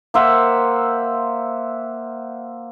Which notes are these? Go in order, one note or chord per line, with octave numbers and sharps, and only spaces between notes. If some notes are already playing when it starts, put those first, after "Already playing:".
A#3 C5 E5 F#5